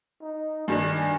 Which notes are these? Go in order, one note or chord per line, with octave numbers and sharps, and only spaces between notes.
D#4
G2 D#3 D4 G#5